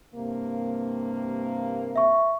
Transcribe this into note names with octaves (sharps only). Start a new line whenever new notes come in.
G2 C3 A#3
E5 C#6